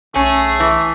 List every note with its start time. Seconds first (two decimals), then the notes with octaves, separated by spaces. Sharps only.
0.16 B1 A3 C#4 G#4
0.60 E3